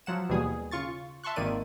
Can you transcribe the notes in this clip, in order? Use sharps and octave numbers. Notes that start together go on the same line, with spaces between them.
F3 F#3 F#5 E7
D#2 B2 E3 G3 G#4 D#6
C#3 F4 C#6 A6
E5 A5 C6 C#6 F#6
G#1 D#3 A#3 D5 D#7